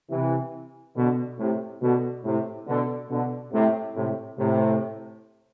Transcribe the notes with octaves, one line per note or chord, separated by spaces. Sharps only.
C3 E3
B2 D3
A2 C3
B2 D3
A2 C3
B2 D3
B2 D3
A2 C3
A2 C3
A2 C3